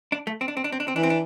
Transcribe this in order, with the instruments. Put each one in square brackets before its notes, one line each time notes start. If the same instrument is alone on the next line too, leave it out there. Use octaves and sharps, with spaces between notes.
[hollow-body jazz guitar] D4
A3
C4
D4
C4
D4
C4
D4
C4
[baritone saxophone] E3 [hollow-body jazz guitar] D4
[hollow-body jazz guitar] C4
D4